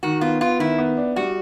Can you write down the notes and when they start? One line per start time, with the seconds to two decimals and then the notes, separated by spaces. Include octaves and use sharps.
0.03 D#3 F#4
0.21 B3 F4
0.41 B3 F4
0.59 D#3 E4
0.78 B3
0.97 D4
1.16 G3 F#4